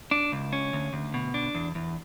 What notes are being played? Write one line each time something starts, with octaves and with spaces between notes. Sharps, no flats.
D4
C#2
C#4
D2
D2
B2
D4
E2
E2